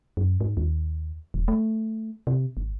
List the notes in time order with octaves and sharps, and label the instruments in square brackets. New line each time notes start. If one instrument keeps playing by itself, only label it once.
[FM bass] F#2
G#2
D#2
D#1
A3
C3
G#1